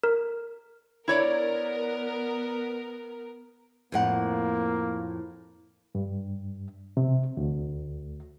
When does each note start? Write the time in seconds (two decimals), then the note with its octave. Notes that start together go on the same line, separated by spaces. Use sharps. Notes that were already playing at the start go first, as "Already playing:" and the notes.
0.03 A#4
1.08 B3 E4 A#4 C#5 D5
3.92 F2 A2 A#3 F#5
5.95 G2
6.97 C3
7.37 D2